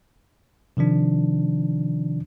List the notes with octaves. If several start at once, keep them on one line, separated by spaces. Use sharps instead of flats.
C3 D#3 F3 D4